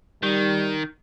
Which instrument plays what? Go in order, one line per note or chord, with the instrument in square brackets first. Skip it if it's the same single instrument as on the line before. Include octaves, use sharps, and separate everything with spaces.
[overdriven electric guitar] D#3 [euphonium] G3